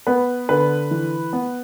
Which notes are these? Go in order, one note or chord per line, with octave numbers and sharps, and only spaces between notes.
B3 B4
D3 B4
E3
B3